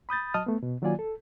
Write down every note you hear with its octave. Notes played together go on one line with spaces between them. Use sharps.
B5 D#6 G6 A6
F#3 D#5 A5 D#6 F6
A3 B3
B2
D#3 F#3 A#3 F4 D5 G#5
A4